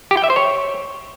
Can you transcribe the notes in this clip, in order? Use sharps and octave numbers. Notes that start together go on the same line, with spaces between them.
G4
G5
E5
C5
C#5